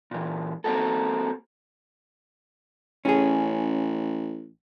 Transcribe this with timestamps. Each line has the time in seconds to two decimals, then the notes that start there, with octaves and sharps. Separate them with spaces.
0.11 A#2 E3
0.64 A#3 C4 F#4 A4
3.05 A1 C#4 G#4